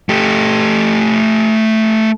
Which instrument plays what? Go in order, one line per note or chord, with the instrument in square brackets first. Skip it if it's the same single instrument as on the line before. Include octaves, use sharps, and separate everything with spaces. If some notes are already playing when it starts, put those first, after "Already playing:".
[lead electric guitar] A3 G4